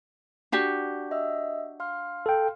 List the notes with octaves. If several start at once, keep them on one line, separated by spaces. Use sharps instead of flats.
D4 F#4 G4
D#5 E5 E6
F5 C6 F6
A4 G5